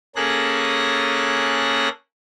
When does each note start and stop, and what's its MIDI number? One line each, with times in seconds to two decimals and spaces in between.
0.16 1.89 58
0.16 1.89 61
0.16 1.89 68
0.16 1.89 69
0.16 1.89 90
0.16 1.89 94